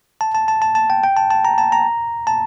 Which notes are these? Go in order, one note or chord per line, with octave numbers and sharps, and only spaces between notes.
A5
A5
A5
A5
A5
G5
G5
A5
A5
A#5
A5
A#5
A5